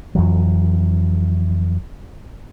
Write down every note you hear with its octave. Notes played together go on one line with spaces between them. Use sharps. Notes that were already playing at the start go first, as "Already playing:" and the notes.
F2 E3 F#3